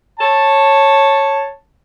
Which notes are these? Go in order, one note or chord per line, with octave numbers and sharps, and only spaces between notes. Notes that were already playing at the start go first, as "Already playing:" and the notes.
C#5 A5